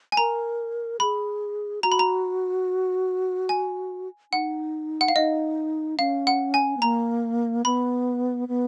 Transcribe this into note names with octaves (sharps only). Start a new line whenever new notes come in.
G#5
A#4 A#5
G#4 B5
F#4 A#5
B5
A#5
G#5
D#4 F#5
F#5
F5
D#4 D#5
C#4 F5
F#5
G#5
B3
A#3 A#5
B3 B5
B3